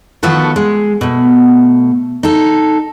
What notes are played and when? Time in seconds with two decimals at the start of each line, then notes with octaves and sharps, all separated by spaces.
0.23 D#3 F3 A3 B3 F#4 A4
0.56 G#3
1.01 B2 A3
2.23 D#4 A4